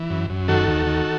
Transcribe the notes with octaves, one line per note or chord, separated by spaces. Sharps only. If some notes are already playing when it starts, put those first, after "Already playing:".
Already playing: E3
F#2
F#2
D#3 F#4 A4
D#2
D#3